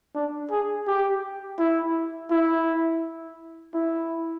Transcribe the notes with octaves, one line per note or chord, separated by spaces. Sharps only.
D4
G#4
G4
E4
E4
E4